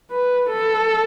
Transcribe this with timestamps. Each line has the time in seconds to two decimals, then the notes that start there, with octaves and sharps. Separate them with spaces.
0.11 B4
0.49 A4